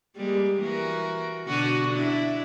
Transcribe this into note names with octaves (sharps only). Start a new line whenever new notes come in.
G3 G#3 A#3
E3 F#4 A#4
B2 D3 F#4
D4 E4